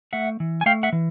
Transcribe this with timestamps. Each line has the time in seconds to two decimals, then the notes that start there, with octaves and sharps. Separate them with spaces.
0.13 A3 E5 F#5
0.40 E3
0.61 G#5
0.66 A3 F5 G5
0.83 E5 F#5
0.92 E3